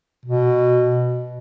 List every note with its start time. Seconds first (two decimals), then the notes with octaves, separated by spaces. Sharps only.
0.26 B2